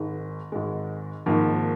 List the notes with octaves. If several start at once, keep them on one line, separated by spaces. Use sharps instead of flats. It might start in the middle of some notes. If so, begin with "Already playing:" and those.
Already playing: G#1 G#2 G#3
G#1 G#2 G#3
G#1 G#2 F3 A#3